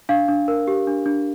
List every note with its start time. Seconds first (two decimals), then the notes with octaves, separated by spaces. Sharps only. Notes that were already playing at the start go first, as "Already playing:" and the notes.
0.09 D4 F5
0.28 D4
0.48 A#4
0.68 G4
0.87 D4
1.06 D4